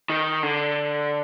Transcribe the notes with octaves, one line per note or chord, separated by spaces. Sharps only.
D#3
D3